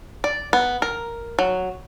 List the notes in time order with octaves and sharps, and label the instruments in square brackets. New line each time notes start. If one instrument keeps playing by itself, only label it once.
[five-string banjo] D5
B3
A#4
F#3